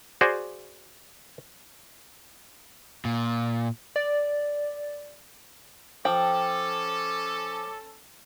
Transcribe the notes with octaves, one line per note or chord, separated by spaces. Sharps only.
F#4 G#4 C5 D5
A#2
D5
F3 C#4 A4 G5 D6